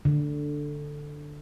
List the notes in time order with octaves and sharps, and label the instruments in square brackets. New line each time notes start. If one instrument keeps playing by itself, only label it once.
[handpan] D3